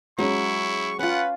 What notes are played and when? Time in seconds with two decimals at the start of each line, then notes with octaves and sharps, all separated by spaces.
0.19 F#3 G#3 C#4 E4 C#6
0.99 C#4 F4 B4 F#5